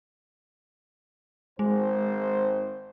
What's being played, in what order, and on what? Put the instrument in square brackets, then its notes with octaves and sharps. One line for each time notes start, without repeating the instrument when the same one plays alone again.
[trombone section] G#1 C5 [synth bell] G#3